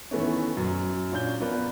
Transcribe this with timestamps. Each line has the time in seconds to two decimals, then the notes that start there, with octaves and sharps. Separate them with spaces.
0.11 D#3 E3 A3 B3 C#4
0.57 F#2
1.12 A#2 C#4 D4 G6 G7
1.40 F3 B3 A#4 B4 D5